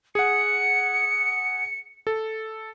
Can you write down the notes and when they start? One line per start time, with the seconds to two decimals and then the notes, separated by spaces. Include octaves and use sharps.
0.15 G#4 F#5 C#7
2.07 A4